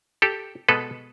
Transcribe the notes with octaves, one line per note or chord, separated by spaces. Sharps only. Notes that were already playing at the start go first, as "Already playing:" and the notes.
G4 A4
B2 G#3 B3 A4 B4